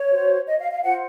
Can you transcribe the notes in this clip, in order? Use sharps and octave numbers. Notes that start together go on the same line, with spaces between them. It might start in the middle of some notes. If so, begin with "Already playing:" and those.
Already playing: C#5
F#4 C5
D#5
F5
F5
F4 C5 F#5